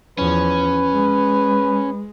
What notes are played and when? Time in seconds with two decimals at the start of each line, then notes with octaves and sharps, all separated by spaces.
0.18 E2 F3 C#4 B4
0.93 G#3